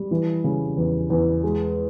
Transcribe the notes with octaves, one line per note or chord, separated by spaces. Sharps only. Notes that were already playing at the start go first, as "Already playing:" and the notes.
Already playing: G3
E3
C#3
E2
E2
G#3